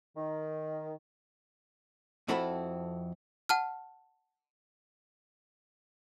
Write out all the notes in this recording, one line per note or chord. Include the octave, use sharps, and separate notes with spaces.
D#3
F2 C4 E4 F#4 A4 B5
F#5 A5 F6